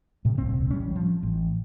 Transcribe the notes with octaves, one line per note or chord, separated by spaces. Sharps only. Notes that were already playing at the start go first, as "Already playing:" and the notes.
A2 C3
D#1 C2 C4
A1 G3 C4 C#4
F3
A1